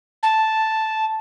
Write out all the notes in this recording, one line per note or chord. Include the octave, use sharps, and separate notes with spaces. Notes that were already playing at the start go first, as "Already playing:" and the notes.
A5